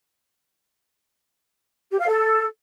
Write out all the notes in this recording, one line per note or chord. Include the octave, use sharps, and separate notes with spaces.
G4
F5
A4